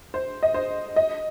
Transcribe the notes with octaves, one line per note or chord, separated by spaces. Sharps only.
C5
D#5
C5
D#5